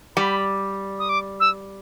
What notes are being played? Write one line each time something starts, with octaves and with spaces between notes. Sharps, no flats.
G3 B5
D#6
D6
E6